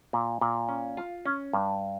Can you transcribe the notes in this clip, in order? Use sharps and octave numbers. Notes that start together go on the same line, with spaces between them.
A#2
A#2
C#4
F4
C#4
G2